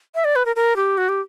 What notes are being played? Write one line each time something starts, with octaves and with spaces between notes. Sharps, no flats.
E5
D5
B4
A#4
A#4
G4
F#4
G4